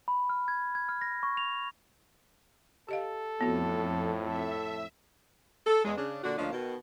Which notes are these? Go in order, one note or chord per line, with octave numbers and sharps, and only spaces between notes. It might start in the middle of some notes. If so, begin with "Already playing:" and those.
B5
F6
G#6
G#6
F6
A#6
C#6
F7
G4 A4 D#5 F5
F2 A2 B3 F#4
A4 E5
A4
E2 G#3
C#3 D4
A#2 D3 D4 F#4
D2 F3 A#3 C#4 D4 D#5
B2 D#3